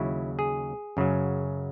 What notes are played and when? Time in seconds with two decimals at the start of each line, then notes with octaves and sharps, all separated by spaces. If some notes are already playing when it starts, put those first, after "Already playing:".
Already playing: D#2 C#3 F#3 E4
0.39 G#4
0.97 F#2 C#3 F#3